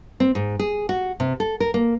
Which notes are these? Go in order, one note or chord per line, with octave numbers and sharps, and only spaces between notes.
C4
G#2
G#4
F#4
C3
A4
A#4
A#3